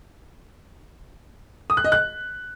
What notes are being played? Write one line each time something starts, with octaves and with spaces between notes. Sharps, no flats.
D#6
F#6
D#5
F#6